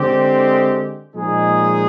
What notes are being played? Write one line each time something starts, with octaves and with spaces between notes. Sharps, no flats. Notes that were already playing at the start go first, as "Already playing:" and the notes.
Already playing: D3 G#3 C4 G4
A#2 F3 G#3 D#4 G#4